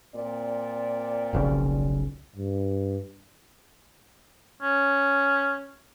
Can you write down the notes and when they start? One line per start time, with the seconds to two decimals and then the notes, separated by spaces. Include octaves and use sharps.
0.15 A#2 C4 D5
1.33 F1 B1 C#3
2.36 G2
4.62 C#4